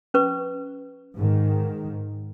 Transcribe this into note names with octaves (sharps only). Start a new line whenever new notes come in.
C#4 B4 C#6
G#2 D#3